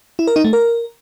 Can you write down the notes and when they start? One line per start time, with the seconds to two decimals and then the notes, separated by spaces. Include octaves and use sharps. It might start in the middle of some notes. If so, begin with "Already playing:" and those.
0.19 E4
0.27 A#4
0.36 D#4
0.44 A3
0.53 A#4